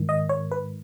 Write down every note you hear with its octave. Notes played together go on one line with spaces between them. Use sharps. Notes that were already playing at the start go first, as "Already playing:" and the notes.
Already playing: G#2 D#3
D#5
C#5
B4